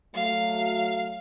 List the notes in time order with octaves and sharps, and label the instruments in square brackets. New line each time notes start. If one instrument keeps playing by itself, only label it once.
[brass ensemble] F#3 A3 [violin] F5